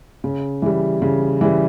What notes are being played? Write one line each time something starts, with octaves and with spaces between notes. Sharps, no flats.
C#3
E3 G3
C#3
E3 G3